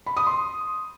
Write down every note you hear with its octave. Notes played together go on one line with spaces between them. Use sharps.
B5
D#6
C6